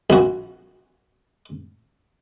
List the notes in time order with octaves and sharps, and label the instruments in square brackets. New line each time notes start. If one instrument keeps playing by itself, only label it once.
[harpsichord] A#1 F#4